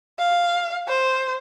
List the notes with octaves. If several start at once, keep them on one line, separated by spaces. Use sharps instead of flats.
F5
C5